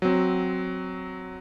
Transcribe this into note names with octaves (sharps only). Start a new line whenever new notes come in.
F#3 C4